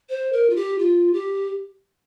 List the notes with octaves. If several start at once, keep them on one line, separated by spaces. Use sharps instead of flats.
C5
A#4
F4
G4
F4
G4